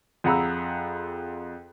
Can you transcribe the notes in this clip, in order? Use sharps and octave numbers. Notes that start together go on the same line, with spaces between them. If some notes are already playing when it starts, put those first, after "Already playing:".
F2 G#4 F#5 A#5 B5 E6